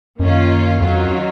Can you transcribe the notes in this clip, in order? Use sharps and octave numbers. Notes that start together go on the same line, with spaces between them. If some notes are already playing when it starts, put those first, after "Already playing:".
F#2 D#3 A#3 C#4 F4
F2 D#3 F#3 C#4 F4